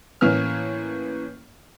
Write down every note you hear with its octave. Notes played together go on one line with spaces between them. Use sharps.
A2 E3 A#3 C#4 F6